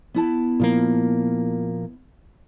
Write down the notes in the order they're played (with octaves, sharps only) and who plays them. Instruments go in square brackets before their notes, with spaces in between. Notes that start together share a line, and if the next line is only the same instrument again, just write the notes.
[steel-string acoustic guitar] B3 E4 A5
[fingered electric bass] A#2 F3 A#3